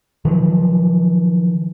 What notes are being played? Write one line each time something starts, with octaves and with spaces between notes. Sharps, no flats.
D#3 F3 F#3